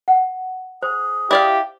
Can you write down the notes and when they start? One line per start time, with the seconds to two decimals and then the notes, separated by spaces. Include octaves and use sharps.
0.08 F#5
0.83 G#4 C5
1.31 E4 G4 D5 F5